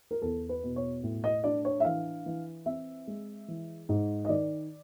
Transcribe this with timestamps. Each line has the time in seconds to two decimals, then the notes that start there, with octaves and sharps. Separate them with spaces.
0.11 A#4
0.22 E2 A4
0.49 B4
0.63 B2
0.76 C#5
1.03 A2
1.24 D#5
1.44 D4 D5
1.65 C#5
1.80 E5
1.84 E3 F5
2.26 E3
2.66 C4 E5
3.07 G#3
3.48 E3
3.89 G#2
4.25 D#5
4.29 D#3 D5